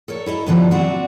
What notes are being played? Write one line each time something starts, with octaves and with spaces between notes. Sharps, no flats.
A4 A#4 C#5
E4 A4 D#5 A#5
G2 B2 D3 E3 F3 G3
F#3 C4 D4 F#4